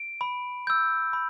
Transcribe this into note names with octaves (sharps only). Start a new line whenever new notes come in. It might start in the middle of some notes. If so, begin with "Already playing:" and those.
Already playing: D7
B5
E6 G6
B5